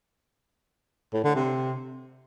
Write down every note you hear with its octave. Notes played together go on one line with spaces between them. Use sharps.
A2
D3
C3